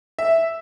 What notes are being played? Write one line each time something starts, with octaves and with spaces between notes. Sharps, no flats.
E5